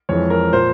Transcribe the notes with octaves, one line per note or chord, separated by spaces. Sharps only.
F2 E3 G#3 C#5
A#4
A#2 F3 A#3 C5